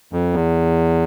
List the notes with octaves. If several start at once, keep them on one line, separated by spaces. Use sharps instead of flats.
F2
E2